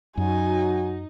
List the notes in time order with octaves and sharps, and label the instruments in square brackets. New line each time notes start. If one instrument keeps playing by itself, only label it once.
[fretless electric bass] F#2 [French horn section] F#3 F#4 [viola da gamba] D#4 [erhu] G#5